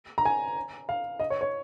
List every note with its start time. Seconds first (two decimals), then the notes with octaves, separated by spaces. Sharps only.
0.18 A#5
0.25 G#5
0.89 F5
1.20 D#5
1.30 C#5
1.41 C#5